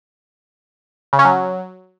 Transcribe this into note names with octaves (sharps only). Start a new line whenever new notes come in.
C#3
C#4
F#3